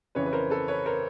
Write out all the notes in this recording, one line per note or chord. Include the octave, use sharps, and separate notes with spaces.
F2 C#3 E3 B4 C#5
B4
A#4 C5
A4 B4
B4 C#5
A#4 C5